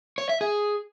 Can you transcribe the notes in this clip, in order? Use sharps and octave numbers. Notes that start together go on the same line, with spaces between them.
C#5
E5
G#4